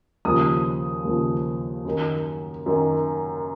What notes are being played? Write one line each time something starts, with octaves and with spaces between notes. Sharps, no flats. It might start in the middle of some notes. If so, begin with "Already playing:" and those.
D#2 C#3 F3 D#6
D#2 C#3 F3
F#2 D#3
F#2 D#3